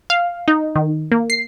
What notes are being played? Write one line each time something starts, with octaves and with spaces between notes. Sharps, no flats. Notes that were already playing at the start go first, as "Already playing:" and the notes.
F5
D#4
D#3
A#3
C7